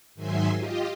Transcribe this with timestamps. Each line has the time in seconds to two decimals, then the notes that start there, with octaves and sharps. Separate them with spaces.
0.15 G#2 D#3 F#3 E5 G#5 C6
0.55 F4 G4 D#5